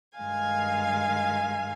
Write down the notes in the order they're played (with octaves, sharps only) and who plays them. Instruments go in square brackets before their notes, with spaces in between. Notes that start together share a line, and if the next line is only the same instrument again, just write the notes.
[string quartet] G2 D#3 G#3 F5 G#5